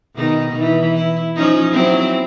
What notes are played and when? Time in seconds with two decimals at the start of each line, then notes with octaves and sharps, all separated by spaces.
0.15 B2 D#3 D#4
0.58 E3
0.95 E4
1.36 F3 C#4 D#4
1.71 F#3 C4 E4